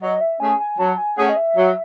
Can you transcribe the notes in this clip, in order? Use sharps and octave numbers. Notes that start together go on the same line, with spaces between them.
F#3 D#5
E5
A3 C#4 G#4 G#5
G#5
F#3 A5
G#5
A3 C#4 G#4 F#5
D#5
E5
F#3